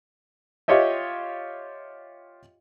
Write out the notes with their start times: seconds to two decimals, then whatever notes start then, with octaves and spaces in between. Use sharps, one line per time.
0.68 F4 G4 C#5 D#5 E5